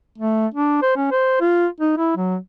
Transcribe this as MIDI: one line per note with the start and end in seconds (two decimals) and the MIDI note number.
0.18 0.47 57
0.54 0.79 62
0.82 0.95 72
0.96 1.08 61
1.11 1.38 72
1.41 1.67 65
1.80 1.93 63
1.98 2.12 64
2.16 2.37 54